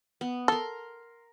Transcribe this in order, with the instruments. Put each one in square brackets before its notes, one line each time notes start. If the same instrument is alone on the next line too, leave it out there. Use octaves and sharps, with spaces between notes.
[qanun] B3
[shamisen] A4 [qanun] A#4 C6